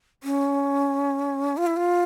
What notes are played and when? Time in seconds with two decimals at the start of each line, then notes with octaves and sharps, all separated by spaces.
0.23 C#4
1.57 F4
1.66 E4
1.76 F4